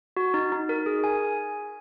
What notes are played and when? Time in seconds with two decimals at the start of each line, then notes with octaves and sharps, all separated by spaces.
0.17 F#4
0.34 D#4
0.52 D#4
0.69 A#4
0.86 G#4
1.04 G#5